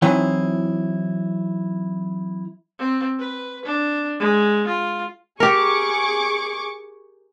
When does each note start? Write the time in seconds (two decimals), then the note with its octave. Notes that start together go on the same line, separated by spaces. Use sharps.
0.02 E3 F#3 C4 D#4 E4
2.79 C4
3.19 B4
3.66 D4
4.19 G#3
4.67 F4
5.40 G4 G#4 A#4 C#6 D6